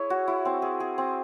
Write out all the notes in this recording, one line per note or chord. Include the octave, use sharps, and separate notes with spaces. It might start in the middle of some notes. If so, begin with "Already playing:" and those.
Already playing: E4 G#4 C#5
F#4
E4
C4
G#4
G#4
C4